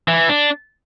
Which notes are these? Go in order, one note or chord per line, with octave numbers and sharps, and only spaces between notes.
E3
D4